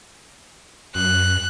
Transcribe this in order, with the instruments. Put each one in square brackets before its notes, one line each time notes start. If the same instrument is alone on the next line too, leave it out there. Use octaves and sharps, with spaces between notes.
[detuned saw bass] F#2 [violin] F#6